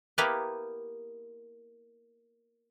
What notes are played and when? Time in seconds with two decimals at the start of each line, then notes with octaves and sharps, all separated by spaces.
0.18 A#3 B3 E4 G4 A#4 B4